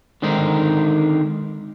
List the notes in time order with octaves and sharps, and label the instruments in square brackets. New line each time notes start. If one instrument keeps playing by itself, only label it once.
[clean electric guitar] D3 D#3 G#3 C4 D#4 A#4